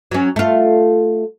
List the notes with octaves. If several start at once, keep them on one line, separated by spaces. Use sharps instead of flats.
F#3 C#4
A3 F4